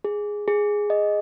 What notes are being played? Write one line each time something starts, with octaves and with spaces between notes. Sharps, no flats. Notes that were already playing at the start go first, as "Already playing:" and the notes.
G#4
G#4
D#5